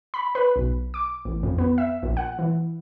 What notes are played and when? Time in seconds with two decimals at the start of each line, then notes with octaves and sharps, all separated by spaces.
0.14 B5
0.35 B4
0.56 B1
0.94 D6
1.25 A1
1.43 F2
1.58 B3
1.78 E5
2.03 A#1
2.17 F#5
2.39 E3